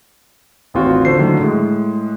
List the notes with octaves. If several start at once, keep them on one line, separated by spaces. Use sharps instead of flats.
A1 D#2 C4 F4 F#4
D3 C5 C7
A2 D3 D#3 F#3 A#3
A2 G#3